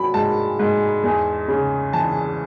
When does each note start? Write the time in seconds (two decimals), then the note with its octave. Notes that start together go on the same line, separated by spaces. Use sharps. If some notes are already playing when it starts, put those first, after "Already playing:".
Already playing: F#3 B5
0.14 G#2 A5
0.59 G#2
1.04 E2
1.48 C#3
1.93 E3 A5